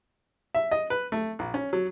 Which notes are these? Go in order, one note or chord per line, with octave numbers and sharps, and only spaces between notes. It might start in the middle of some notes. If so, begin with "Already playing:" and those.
E5
D#5
B4
A3
A#1
C#4
F#3